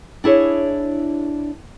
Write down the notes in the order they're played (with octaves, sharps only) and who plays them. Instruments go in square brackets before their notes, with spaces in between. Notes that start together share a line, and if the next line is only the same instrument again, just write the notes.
[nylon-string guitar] D4 E4 G#4 C#5